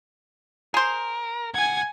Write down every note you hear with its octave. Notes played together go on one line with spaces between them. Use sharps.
G#4 A#4 C5
C#2 F#5 G#5 G#6